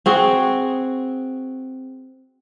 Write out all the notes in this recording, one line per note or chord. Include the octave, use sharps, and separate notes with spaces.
C4 F#4 G#4